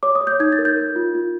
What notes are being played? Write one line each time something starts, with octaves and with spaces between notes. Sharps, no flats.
C#5 D6
D#6
C#5
G6
D#4 G#6
A6
A#4
G6
A#4
F4
F4